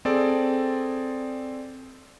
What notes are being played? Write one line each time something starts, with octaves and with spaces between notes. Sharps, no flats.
C4 G#4 A4 D5